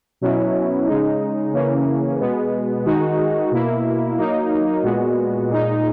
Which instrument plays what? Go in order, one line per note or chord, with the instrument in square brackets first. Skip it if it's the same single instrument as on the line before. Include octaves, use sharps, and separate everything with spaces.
[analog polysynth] B2 F#3 C#4 E4
C#3 G#3 D#4
C#3 E3 A#3 C#4
B2 G#3 B3
D#3 G#3 D#4 F#4
B2 A#3 E4
F#3 A#3 D#4
A#2 G#3 B3 F#4
A#2 G#3 D#4